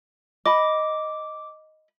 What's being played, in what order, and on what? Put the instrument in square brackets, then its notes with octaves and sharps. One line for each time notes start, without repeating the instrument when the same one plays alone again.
[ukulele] D#5 B5 [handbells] D6